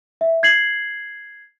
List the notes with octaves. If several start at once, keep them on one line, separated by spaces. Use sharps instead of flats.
E5
G#6 C7 F#7